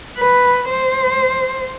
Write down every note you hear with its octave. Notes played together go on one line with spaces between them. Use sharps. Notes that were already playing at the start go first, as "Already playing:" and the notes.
B4
C5